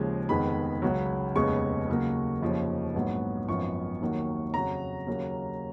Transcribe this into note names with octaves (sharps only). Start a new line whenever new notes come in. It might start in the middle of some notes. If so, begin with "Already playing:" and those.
Already playing: D#2 C#3 F3 G#3
F1 F2 D#3 G#3 B3 B5
C#2 C#3 F#3
F1 D#2 C#3 G#3 B3 C#6
D#2 C#3 F#3 A#3
F1 D#2 C#3 F3
A#1 G#2 F#3 B3
G#1 F#2 F3 B3 C#6
D#2 D#3 F#3 A#3
F2 C#3 F#3 A#5
D#2 C#3 F#3 A#3